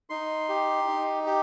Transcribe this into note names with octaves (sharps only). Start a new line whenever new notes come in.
D#4 C6
G4
D#4
G4